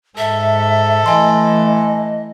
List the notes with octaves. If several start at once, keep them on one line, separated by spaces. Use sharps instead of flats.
G#2 A4 E5
E3 A3 D#5 G#5 C6